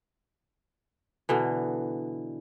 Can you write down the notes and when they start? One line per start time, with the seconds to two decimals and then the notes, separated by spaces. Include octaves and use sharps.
1.29 B2 D3 E3